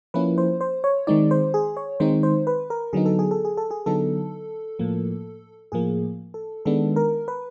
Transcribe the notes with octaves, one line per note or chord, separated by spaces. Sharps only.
F3 A#3 C#4 E4 B4
C5
C5
C#5
D#3 G#3 C4 D#4 D5
C5
G#4
C#5
D#3 G#3 C4 D#4 C5
C5
B4
A#4
D3 F#3 B3 D#4 G#4
A4
G#4
A4
G#4
A4
G#4
D3 F#3 B3 D#4 A4
A2 F3 A#3
A2 F3 A#3 G#4
A4
D#3 G#3 B3 D4 A4
A#4
B4